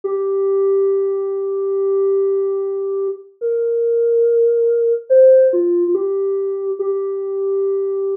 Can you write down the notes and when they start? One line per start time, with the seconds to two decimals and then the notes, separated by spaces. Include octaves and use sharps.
0.04 G4
3.41 A#4
5.10 C5
5.53 F4
5.88 F4
5.95 G4
6.79 G4